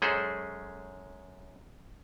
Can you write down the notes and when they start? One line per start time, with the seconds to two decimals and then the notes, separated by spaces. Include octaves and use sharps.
0.02 F#2 G#3 C#4 G#4 A4 C5